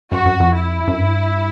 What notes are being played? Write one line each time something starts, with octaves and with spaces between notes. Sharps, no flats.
F#2 F#4
F#2
F2
E4
F#2
G2